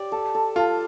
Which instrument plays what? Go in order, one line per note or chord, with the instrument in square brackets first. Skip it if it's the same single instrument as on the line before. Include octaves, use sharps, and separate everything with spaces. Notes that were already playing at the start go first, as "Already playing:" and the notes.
Already playing: [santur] G4 D5
A4
A4
[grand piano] F4 [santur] A4